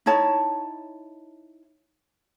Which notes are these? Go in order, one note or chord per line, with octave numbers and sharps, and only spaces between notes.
D#4 E4 C#5 A5